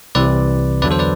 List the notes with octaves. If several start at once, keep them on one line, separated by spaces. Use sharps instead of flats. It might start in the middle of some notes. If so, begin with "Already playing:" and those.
C2 C3 E3 B4 D5
E2 D3 F#3 B4 D5
A4 C5
B4 D5